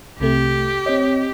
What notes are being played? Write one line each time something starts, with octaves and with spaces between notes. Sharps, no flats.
C2 C3 A3 G4
C4 C#5 D#5